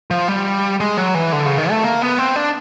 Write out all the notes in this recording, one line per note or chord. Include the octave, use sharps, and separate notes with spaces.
F3
G3
G#3
F#3
E3
D3
C#3
D#3
A3
A#3
B3
C4
D4